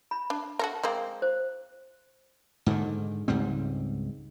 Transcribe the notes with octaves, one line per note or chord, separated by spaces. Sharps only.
B5
D4
F#4 A4 A#4
G#3 A#3 C4
C5
G#2 D3 D#3
C#2 G#2 G3 C4